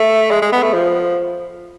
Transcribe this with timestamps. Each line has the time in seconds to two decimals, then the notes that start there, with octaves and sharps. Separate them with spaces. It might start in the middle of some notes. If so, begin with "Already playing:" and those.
Already playing: A3
0.31 G#3
0.42 G#3
0.52 B3
0.63 A3
0.73 F3